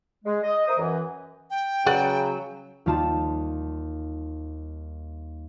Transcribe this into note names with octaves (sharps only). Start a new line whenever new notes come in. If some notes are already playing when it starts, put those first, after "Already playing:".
G#3
D#5
A#4 C5 E5 D#6
F#2 E3
G5
C#3 F#3 B4 D5 F#5
D#2 G3 F4 A5 E7